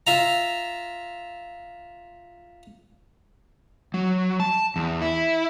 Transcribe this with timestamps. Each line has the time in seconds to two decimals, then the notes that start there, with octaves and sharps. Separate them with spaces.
0.07 F4 E5 A#5
3.94 F#3
4.40 A5
4.76 E2
5.01 E4